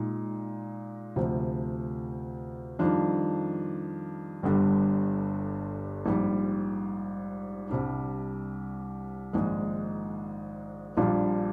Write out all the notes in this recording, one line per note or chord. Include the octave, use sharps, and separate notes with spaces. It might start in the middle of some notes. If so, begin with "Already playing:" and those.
Already playing: A#2 G#3 D#4
D2 C3 F3
F2 D#3 G3 D4 F4
G1 G2 D3 G3
A#1 G#2 G3
C2 C3 G3 D4
A#1 G#2 D#3 G#3
A#1 A#2 G3 D4 F4